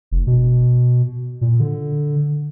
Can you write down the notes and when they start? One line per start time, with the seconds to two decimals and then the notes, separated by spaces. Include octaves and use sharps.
0.11 F1
0.27 B2
1.41 A#2
1.59 D3